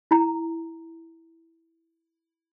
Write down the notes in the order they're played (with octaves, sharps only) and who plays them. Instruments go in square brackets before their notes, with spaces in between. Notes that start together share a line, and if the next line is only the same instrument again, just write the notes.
[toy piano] E4 A#5